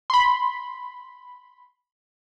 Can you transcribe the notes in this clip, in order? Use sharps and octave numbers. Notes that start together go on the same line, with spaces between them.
B5 C6